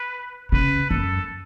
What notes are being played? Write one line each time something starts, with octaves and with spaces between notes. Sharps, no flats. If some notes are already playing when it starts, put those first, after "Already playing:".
Already playing: B4
C#3 B4
F#2 A4